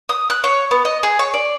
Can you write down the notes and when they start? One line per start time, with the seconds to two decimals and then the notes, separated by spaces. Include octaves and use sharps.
0.09 D#6
0.30 F#6
0.44 C#5
0.71 B3
0.85 D#5
1.03 G#4
1.19 C#5
1.34 D5